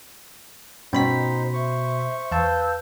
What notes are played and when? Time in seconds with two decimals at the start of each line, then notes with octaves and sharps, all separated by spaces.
0.93 G2 B2 C#4 D#4 C5 G5 B5 B6
1.53 C5 E5 C#6
2.32 E2 B4 F5 A5 E6 G6